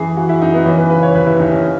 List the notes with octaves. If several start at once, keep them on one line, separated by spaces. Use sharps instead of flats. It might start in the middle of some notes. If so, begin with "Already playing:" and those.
Already playing: F#2 E3 G#4
E3 F#4
E4
F#2 D#4
B3
E3 C#4
B4
C#3 B4
C#5
D#2 B4
E4
D#2 D#4
C#4